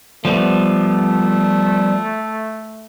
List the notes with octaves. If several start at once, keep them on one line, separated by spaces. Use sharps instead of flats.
F3 G3 A3 B3